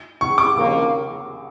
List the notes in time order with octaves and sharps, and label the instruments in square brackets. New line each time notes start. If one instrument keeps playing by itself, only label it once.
[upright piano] C#6
D6
[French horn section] D#2 C#3 F3 A#3